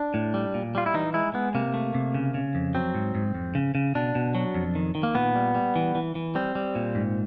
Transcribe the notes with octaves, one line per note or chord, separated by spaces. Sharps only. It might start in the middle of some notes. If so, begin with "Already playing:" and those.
Already playing: D4
A2
G3
A#2
G3 F4
E4
E3 D#4
G#3 E4
G#3 B3
C3 A#3
A3
C3
C#3
C#3
F2
F#3 C4
G#2
G#2
F2
C#3
C#3
B2 D4
B2
F#3
F2
D#3
D#3
A#3
A#2 B3
G3
G3
E3
E3
E3
G3 C4
G3
A#2
G#2